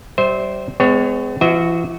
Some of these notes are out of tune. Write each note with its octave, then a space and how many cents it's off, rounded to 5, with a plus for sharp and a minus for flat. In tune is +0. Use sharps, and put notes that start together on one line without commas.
G3 -30 C5 +0 E5 -30
G#3 +0 B3 +45 C#5 +0
E3 +45 F#4 +0 E5 -40